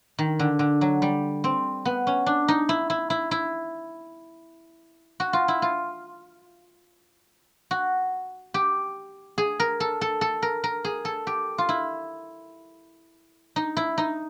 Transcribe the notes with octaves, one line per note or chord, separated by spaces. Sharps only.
D#3
D3
D3
F#3
G3
C4
B3
C#4
D4
D#4
E4
E4
E4
E4
F#4
F4
E4
F4
F#4
G4
G#4
A#4
A4
A4
A4
A#4
A#4
G#4
A4
G4
F4
E4
D#4
E4
D#4